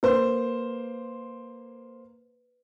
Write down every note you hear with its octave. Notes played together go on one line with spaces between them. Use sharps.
A#3 B4 C5